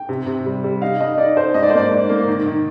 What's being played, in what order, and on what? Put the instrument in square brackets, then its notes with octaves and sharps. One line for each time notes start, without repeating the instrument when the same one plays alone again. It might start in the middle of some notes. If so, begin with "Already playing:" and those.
Already playing: [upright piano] G5
C3
C3
G3
G3
D#4 F5
D#4 D#5
D#4 D5
D#4 C5
G#2 D#5
D5
C5
A#3 D5
G#2
A#3
D#3
D#3